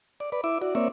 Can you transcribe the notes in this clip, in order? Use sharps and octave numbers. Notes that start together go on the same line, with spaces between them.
D5
B4 D5
E4 E5 D6
F#4 D5
A#3 C4 C#5 D5 E5